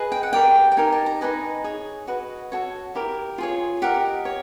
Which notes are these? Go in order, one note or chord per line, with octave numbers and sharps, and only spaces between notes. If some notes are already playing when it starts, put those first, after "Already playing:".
Already playing: G#4 B4 D#5
G5
F#5
G4 A#4 D5 G5
G5
D#4 G4 A#4 G#5
A5
A#5
D#4 F#4 B4 D#5 G#5
G#4 C#5
F#4 B4 D#5
F#4 A4 C#5
E4 G4 A#4
F4 G#4 C#5
G4 A#4 D#5 F#5
C#5